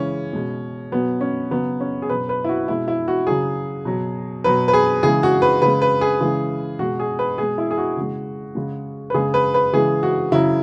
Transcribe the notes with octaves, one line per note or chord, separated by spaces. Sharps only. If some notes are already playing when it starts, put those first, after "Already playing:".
Already playing: C#3 E3 G#3 C#4
B2 G#3
B2 F#3 B3
C#4
C#3 F#3 B3
C#4
G#4
B2 F#3 B4
B4
E4
F#4
B2 G#3 E4
E4
F#4
C#3 F#3 G#4
B2 F#3
B2 F#3 B4
B4
G#4
C#3 E3 G#3 G#4
F#4
B4
C#3 G#3 B4
B4
G#4
C#3 E3 G#3
B2 G#3 F#4
G#4
B4
B2 G#3 G#4
E4
G#4
F#4
C#3 G#3
C#3 G#3
B4
C#3 G#3 G#4
B4
B4
C#3 E3 G#3 G#4
F#4
C#3 F#3 E4